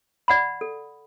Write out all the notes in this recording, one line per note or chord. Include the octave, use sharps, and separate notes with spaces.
D5 F#5 B5
A4